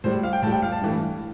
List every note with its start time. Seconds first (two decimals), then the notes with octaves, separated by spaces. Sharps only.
0.04 A2 G3 C5
0.23 F5
0.33 G5
0.42 A2 A5
0.47 G3 G5
0.62 F5
0.72 A5
0.81 G2 E3 A3